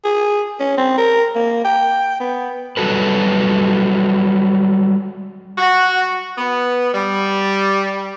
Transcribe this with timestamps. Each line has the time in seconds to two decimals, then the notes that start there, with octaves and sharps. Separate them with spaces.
0.04 G#4
0.60 C#4
0.78 C4
0.98 A#4
1.35 A#3
1.65 G5
2.20 B3
2.77 F#3 G3 F4 F#4 A4 B4
5.58 F#4
6.38 B3
6.94 G3